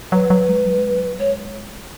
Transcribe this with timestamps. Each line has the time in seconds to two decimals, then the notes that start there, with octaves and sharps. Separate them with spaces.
0.12 F#3 B4
0.30 F#3
0.49 G#3
0.66 F#3
0.78 G#3
0.91 F#3
1.19 G#3 C#5